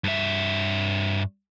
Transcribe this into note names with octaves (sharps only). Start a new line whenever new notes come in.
G2 E5